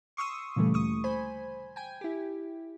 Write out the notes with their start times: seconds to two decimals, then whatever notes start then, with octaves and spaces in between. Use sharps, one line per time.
0.17 C6 C#6 D#6 E6
0.56 A#2 C#3 E3 G3 A3
0.73 D2 C#6 D#6
1.04 C5 G#5 B5
1.76 G5 G#5
2.01 E4 G4